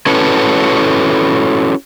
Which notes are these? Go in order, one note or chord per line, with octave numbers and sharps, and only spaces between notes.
C#4 E4 F#4 A4 B4 C#5